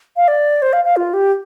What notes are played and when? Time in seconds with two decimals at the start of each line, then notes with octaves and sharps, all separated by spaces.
0.17 F5
0.28 D5
0.62 C5
0.73 F5
0.85 F5
0.97 F4
1.14 G4